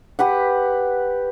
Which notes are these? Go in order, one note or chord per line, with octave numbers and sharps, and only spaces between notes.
G4 B4 F#5